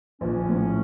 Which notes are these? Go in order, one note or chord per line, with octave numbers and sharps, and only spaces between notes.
A#1 C#4
A2